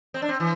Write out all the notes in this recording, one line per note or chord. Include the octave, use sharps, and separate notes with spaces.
C4
D4
C4
E3